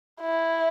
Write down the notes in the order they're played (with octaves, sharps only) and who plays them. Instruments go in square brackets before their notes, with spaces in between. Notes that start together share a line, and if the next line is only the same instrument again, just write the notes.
[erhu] E4